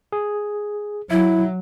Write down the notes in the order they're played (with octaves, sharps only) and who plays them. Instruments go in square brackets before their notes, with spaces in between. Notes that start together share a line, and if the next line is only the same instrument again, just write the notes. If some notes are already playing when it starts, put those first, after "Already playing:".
[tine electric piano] G#4
[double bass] F#3 [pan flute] E4 [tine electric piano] E5